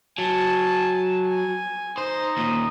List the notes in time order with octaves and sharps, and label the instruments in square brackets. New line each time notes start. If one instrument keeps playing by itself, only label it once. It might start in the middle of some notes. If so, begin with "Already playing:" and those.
[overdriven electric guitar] F#3 [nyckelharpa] G#5 A5
[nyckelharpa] G#5
[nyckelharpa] D#4 [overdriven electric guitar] C5
[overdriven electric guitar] D#2 A#2